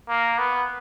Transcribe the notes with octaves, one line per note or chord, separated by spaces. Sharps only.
A#3
B3